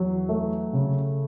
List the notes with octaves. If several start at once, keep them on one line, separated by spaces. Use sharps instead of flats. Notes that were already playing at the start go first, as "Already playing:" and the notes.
Already playing: E2 F#3
A3
C#3